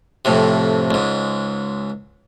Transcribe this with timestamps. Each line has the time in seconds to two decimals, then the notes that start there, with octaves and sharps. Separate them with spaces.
0.25 F2 A2 C3
0.91 C#2 G#2